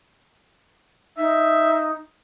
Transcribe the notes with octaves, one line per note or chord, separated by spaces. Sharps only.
D#4 E5